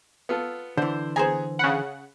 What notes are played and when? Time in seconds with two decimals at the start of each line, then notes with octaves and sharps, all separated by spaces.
0.29 B3 F4 A4
0.77 D3 E3 D4 C5
1.16 B3 G#4 C5 G#5 A#5
1.59 C#3 F#5 B5